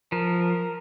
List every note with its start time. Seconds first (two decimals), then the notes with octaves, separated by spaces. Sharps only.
0.12 F3 A#4